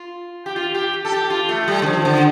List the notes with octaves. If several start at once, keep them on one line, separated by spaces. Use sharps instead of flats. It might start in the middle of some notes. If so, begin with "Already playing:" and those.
Already playing: F4
G4
F4
G4
A4
G4
F4
A3
G3
D3
F3
D3